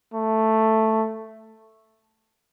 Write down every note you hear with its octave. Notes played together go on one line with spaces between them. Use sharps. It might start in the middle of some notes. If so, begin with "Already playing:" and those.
A3